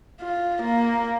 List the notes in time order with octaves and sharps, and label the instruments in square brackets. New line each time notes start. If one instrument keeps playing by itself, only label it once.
[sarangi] F4
A#3